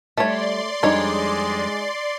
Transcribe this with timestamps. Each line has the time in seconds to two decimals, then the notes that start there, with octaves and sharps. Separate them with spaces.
0.18 G3 A3 G4 C#5 D5 C6
0.83 F2 G3 G#3 D4 D#4 C#5